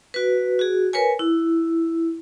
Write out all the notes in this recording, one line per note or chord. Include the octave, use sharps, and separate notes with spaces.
F#4 B4
F#4 G#4
A#4 B4 C#5 G#5
E4